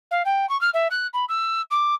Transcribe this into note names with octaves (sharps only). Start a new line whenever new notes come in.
F5
G5
C#6
F6
E5
F#6
B5
E6
D6